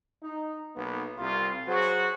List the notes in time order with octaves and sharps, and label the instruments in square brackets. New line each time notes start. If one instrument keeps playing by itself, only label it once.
[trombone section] D#4
B1 A#3 B3
[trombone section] C2 [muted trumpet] F4
[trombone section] F#3 G#4 C5 [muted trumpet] F#4